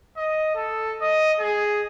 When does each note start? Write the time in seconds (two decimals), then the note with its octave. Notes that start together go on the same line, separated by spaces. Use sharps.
0.17 D#5
0.56 A4
1.01 D#5
1.40 G#4